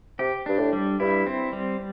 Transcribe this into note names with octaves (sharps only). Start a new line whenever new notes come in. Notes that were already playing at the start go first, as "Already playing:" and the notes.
C3 G4
G2 D4
A2
G3
G2 E4
C4
G3